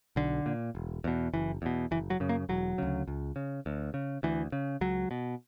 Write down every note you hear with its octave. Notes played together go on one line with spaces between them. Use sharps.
B1 D3
A#2
E1
E2 B2
F#1 E3
E2 B2
F#1 E3
F#3
F#2 C#3
A#3
E1 F#3
D2 C#3
C#2
C#3
D2
C#3
D2 E3
C#3
C#2 F#3
B2